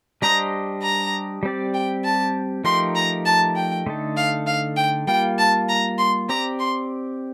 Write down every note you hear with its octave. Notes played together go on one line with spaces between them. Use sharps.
G3 D4 G4 C5 D#5 A#5
A#5
G3 C4 G4 D5
G5
A5
F3 A3 D#4 G4 A#4 C6
A#5
A5
G5
D3 A3 D#4 A4
F5
F5
G5
G3 A#3 F4 G5
A5
A#5
C6
C4 G4 D5 A#5
C6